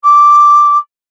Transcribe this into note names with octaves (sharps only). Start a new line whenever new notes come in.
D6